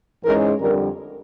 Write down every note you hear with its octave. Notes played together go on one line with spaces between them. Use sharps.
G#2 E3 G#3 C#4 A#4
F2 D3 G3 A#4